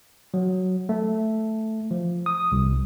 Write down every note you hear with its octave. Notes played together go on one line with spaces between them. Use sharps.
F#3
A3
F3
D#6
C2